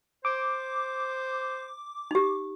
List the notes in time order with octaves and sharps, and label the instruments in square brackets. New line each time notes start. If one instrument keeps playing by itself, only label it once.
[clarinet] C5 [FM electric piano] D6
[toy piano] D#4 G4